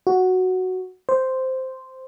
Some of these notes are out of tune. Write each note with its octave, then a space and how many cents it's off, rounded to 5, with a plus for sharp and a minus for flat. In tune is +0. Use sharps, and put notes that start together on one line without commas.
F#4 +0
C5 -5